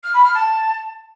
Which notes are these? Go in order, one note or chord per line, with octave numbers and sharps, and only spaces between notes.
F6
B5
F6
A5